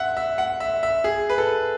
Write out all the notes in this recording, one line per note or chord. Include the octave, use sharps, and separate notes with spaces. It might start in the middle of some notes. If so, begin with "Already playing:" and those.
Already playing: E5 F#5
E5
F#5
E5
E5
G#4
B4
A4